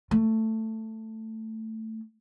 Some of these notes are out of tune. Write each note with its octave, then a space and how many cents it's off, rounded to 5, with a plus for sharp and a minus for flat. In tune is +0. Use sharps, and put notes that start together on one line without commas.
A3 +10